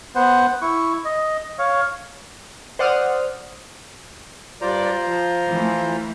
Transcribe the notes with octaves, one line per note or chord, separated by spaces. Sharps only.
B3 C5 F#5
E4 C#6
D#5
C#5 F5
C5 D5 F#5 D#6 F6
G2 F4 C5 D5 A#5
F3
E3 A3